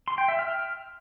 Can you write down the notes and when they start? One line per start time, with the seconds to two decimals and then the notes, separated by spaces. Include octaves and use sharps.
0.08 C6
0.18 G5
0.28 E5
0.39 F6